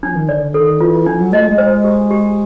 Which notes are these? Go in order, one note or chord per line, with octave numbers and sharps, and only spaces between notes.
F3 D4
D#3
D3 D5
D3
D#3 A4
E3 F4
F3 D4
F#3
A3 D#5
G#3
C5
G4
G4